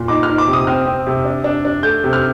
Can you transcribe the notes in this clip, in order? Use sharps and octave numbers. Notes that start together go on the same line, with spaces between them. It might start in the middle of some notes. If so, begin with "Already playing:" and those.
Already playing: A#2
D#4 D6
F6
D#4
D6
C3
D#6
C4 F6
C4
C3
D4
D4
D4
A3 G6
C3
F6